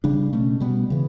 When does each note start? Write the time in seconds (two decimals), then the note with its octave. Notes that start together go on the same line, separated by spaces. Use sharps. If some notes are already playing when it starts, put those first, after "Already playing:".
0.04 C#3 G3 D4
0.33 B2 A3 C#4
0.60 B2 G3 B3
0.90 C#3 E3